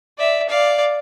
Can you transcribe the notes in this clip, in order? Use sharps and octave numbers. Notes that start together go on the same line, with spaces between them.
D5 E5
D5 F5